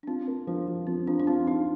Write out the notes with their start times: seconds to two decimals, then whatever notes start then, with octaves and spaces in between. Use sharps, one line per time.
0.03 D4
0.07 C4 F4
0.27 A#3
0.47 F3 D4
0.68 F3
0.87 F3 C4
1.07 F3 D4
1.20 D4
1.27 C4 F4
1.47 D#4 F4